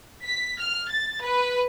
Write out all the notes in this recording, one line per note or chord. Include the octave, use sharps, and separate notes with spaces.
B6
F6
A6
B4